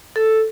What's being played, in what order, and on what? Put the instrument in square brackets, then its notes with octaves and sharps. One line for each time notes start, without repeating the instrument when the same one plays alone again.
[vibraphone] A4